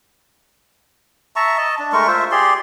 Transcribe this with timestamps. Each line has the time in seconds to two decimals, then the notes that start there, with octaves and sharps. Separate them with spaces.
1.36 E5 A5 A#5 C#6
1.57 D#5 A5
1.79 D4
1.93 G#3 A3 A#4 C#6
2.08 F4 C5 E5
2.31 G4 G#4 D5 C6